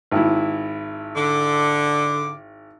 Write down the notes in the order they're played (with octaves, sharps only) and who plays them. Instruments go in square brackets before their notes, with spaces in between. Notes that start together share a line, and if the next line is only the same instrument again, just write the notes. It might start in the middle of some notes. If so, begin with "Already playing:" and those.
[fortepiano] G#1 E4
[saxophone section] D3 [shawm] D6